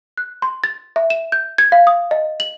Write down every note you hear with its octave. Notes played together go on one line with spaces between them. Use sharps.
F#6
C6
A6
E5
E7
G6
G#6
F5
D#6
D#5
F#7